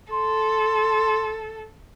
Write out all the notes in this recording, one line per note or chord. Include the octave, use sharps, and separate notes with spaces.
A4 C6